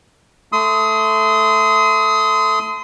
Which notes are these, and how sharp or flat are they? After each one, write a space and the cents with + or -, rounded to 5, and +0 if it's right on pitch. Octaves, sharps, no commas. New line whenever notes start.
A3 +0 C6 -30 D#6 +25